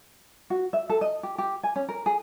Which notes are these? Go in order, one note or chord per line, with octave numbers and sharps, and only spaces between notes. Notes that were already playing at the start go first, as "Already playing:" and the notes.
F#4
E5
A4
D#5
G4
G4
G#5
C#4
A#4
G#4